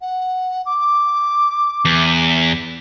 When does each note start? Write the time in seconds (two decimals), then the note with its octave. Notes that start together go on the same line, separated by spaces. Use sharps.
0.01 F#5
0.66 D6
1.85 E2